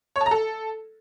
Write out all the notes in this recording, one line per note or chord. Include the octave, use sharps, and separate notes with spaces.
C#5
A5
A#5
A4